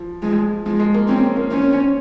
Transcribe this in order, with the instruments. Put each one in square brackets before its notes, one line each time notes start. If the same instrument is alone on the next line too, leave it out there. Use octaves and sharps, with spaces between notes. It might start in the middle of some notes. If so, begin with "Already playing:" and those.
Already playing: [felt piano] F3
[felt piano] F3 [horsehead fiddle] G#3
[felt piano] F3 [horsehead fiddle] G#3
[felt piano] G#3
A#3
[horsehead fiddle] C4 [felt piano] C#4
[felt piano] C4
A#3
[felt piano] C4 [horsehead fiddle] C#4